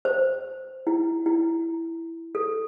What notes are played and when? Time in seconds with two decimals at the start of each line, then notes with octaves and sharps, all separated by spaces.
0.05 C5
0.87 E4
1.26 E4
2.35 A4